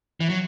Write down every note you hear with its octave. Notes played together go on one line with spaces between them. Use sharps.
E3
F#3